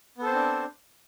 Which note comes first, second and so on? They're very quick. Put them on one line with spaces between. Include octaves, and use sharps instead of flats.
B3 A4 C5 C4 D4